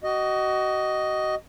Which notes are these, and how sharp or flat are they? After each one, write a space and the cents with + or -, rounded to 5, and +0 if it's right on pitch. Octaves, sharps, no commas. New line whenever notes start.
F#4 +30 D#5 +0